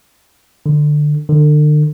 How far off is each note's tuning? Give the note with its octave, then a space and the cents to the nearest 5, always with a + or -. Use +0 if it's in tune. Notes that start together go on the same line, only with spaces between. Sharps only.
D3 +20
D3 +40